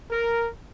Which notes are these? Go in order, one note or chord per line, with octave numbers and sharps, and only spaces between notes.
A#4